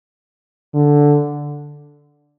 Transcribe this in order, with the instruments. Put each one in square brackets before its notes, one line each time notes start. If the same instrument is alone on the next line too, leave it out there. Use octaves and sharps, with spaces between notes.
[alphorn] D3